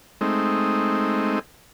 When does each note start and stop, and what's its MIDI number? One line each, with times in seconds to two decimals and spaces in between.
0.21 1.39 56
0.21 1.39 57
0.21 1.39 60
0.21 1.39 63